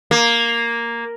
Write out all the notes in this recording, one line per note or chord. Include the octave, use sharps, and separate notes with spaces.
A#3